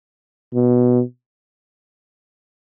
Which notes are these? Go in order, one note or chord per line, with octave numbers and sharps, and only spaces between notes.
B2